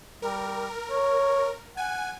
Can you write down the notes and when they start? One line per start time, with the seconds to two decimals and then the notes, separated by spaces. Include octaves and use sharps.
0.22 G3 A#4
0.90 C#5
1.77 F#5 G#5